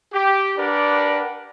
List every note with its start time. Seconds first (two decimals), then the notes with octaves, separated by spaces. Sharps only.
0.14 G4
0.57 D4 G4 A#4 B4 D5 F#5